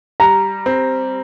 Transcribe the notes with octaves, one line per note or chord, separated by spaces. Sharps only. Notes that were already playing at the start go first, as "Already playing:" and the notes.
G3 A#5
C4